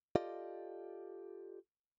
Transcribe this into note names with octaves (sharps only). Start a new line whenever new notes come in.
F4 G4 A4 D5 D#5 F5